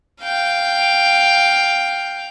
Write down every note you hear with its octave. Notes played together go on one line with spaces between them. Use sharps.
F5 G5